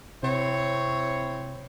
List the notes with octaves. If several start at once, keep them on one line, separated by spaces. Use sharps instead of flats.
C3 C4 E4 C#5